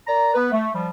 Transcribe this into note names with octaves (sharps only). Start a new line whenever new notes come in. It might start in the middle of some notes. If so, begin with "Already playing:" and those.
A#4 D5 A#5
B3 B4
A3
F3 G3